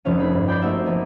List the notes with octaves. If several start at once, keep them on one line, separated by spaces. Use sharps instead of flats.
F1 F3 C4 C#4 F5 D#7
D#4 G#4 B5
G1
D5 G5 B5 G6 A6 C7
A3 A#3 C4 D#4 F#4 E5
F3 A#3 B3